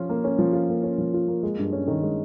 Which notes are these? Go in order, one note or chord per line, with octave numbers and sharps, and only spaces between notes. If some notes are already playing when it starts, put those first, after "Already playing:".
Already playing: F3 C#4 F4
A#3
C#4
F3
F4
A#3
C#4
F3
F4
A#3
G#3
G2
C#4
D#3
G#3